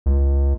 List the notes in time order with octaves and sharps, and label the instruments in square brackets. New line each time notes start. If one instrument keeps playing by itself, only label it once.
[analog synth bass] C#2